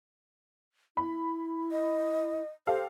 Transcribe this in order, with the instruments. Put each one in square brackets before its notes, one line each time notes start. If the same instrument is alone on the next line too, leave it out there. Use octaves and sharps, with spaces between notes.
[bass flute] E4 [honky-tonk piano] B5
[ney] D#5
[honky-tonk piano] G4 A4 F5 [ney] C5